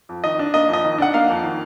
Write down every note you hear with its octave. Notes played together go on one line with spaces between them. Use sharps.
F2
D#3 D#5
D4
A#3 D#5
F2
D#5
D#3
D4 F#5
A#3 F5
F2
D#3